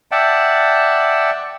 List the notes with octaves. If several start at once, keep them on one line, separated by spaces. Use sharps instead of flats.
D5 E5 F#5 G5 A5